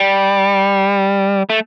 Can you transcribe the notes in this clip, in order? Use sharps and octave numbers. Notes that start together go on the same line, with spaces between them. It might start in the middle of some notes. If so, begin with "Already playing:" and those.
Already playing: G3
A3